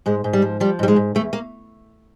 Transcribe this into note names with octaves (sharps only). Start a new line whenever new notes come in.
G#2 G#3
G#2
G3
F3
F3 G3
G#2 G3
G#3
G#2
E2 A3
A#3